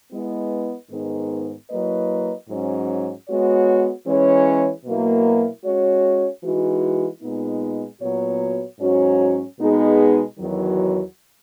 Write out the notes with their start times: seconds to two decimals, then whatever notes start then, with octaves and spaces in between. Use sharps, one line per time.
0.12 G#3 B3 E4 B4 D#5
0.91 G#2 D#3 G#3 B3 D#4
1.70 F#3 A#3 E4 B4 D#5
2.48 G#2 F#3 C#4
3.27 G#3 B3 F#4 C#5
4.06 E3 G#3 C#4 G#4 C#5
4.85 B2 F#3 A#3 E4
5.64 G#3 C#4 F#4 C#5
6.44 E3 G#3 D#4 F#4
7.22 A#2 G#3 B3 D#4
8.01 A#2 F#3 B3 F#4 C#5
8.80 G#2 F#3 C#4 F#4 C#5
9.60 B2 G#3 B3 D#4 G#4
10.38 E2 D#3 F#3